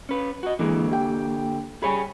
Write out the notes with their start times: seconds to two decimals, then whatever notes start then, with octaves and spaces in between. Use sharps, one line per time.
0.09 C#4 B4
0.43 F#4 D#5
0.59 D3 E3 G#3 A#3
0.91 G4 G5
1.82 G3 G#4 C#5 G#5 B5